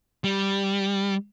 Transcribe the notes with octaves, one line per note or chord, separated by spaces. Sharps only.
G3